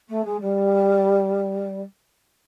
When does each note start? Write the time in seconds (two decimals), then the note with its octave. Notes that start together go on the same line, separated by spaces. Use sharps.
0.08 A3
0.24 G#3
0.40 G3